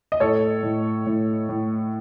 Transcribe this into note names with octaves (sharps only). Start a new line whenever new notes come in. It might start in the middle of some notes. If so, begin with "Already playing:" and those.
D#5
A2 A4 C#5
A2
A2
A2